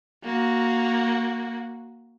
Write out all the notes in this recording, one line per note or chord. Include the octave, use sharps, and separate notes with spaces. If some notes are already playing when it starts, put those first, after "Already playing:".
A#3 F#4